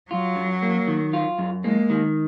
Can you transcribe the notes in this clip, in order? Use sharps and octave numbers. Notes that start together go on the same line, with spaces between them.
F#3 F4
F#2
A#3
D#3
F4
F#2
G#3 A#3
D#3